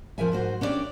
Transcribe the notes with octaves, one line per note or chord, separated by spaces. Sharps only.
F2 F3 A#4 E5 G#5
G#2 F#4 C5
C#4 D4 E4 G4 D5